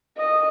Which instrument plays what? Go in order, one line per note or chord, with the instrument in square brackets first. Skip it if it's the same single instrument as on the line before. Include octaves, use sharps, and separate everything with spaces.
[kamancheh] D#5